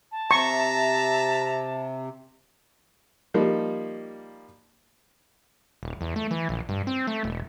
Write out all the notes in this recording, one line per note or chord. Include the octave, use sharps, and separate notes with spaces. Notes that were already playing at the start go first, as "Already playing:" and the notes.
A5
C3 E5 A#5 C#6
F3 G3 A#3 D#4
D#1
E2
A3
E3
A#1
G2
C4
A3
E1